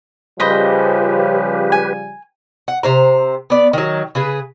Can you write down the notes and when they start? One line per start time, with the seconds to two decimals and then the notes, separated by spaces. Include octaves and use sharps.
0.40 C#3 F3 G3 G4 B4 C5 D#5 B5
1.72 G#5
2.68 F#5
2.83 C3 C5 A#5
3.50 B3 D5
3.73 D#3 F#3
4.15 C#3 G#4 B4